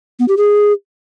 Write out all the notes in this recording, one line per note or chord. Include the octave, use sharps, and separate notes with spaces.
B3
G4
G#4